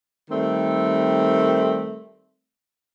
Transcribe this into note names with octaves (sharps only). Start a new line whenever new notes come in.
D#3 G3 A3 C4